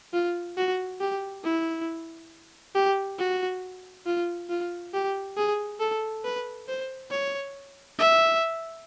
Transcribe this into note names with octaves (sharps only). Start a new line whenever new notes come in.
F4
F#4
G4
E4
G4
F#4
F4
F4
G4
G#4
A4
B4
C5
C#5
E5